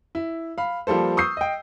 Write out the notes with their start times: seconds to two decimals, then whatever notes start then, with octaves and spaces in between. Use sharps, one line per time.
0.15 E4
0.58 F5 B5
0.87 F3 G3 A#3 A4 C5
1.17 C#6 D#6 E6 G6 C7
1.37 D#5 G5